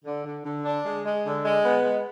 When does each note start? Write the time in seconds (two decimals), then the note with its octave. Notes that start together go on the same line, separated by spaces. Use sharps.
0.05 D3
0.25 D3
0.45 D3
0.65 D4
0.85 G#3
1.05 G#3
1.25 D3
1.45 G#3
1.65 B3
1.84 G#3